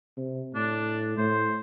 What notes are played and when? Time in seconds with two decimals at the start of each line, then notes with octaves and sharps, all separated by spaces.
0.17 C3
0.55 A2 D4
1.17 A2 C5